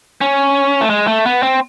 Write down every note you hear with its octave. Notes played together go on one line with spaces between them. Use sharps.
C#4
A3
G#3
A3
B3
C4